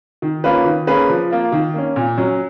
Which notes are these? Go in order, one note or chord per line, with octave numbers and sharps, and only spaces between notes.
D#3
A#3 C#4 F4 B4
D#3
A#3 C#4 G#4 B4
F3
A#3 F4
D#3
A#3 C#4
A#2
F#3 C#4